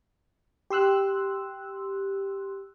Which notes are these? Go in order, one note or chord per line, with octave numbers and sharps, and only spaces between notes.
G4 C6 E6 F#6